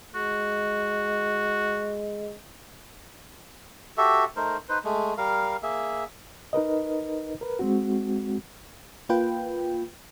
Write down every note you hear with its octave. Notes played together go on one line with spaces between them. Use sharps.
G#3 F#4
F#4 G4 A4 E5
A3 D#4 A#4 C5
D#4 B4 C5
G#3 A3
G3 A#4 F5
A#3 G#4 E5
D#4 A#4 B4 D#5
A#4 B4
G#3 C4 F#4
A#3 F4 B4 G5